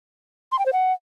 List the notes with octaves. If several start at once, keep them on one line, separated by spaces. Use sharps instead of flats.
C6
G5
C5
F#5